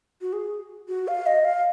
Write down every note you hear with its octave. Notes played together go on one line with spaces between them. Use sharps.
F#4
G#4
F#4
F5
D#5
F5